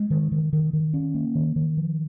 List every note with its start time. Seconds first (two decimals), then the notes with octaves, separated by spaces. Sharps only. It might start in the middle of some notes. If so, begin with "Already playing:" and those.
Already playing: G#3
0.10 D#3
0.32 D#3
0.53 D#3
0.73 D#3
0.94 C#4
1.14 A#3
1.35 D#3
1.56 D#3
1.77 F3